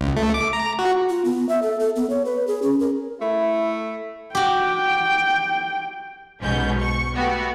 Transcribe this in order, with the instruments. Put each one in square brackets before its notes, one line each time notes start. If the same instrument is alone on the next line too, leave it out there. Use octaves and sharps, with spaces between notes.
[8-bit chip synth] C#2
A3
D6
A#5
F#4
[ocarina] F4
B3
E5
A4
A4
B3
C#5
B4
G#4
C#4
A#4
[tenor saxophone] A3 [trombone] E4
[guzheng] F#4 G4 [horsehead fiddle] G5
[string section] B1 G#2 B2 C#4 G6
C#6
A3 B3 F#4 G4